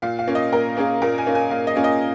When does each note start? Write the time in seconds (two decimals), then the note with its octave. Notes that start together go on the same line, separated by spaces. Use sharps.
0.02 A#2 F5
0.19 F5
0.27 A#3 C#4 F4
0.35 D#5
0.52 A#2 A#4
0.77 A#3 C#4 F4 G#4
1.02 A#2 A#4
1.18 G#5
1.26 A#3 C#4 F4
1.35 G#5
1.50 A#2 F5
1.67 D#5
1.76 A#3 C#4 F4
1.84 D#5